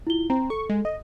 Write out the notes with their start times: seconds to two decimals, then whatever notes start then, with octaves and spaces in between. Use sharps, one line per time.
0.07 E4 F4 G7
0.30 C4 A#5
0.50 A4 C#6
0.70 G#3
0.85 D#5